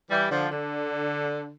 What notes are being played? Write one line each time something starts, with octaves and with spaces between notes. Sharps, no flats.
E3 G3
D3 F3
D3